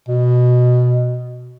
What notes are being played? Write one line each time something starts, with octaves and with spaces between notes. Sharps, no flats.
B2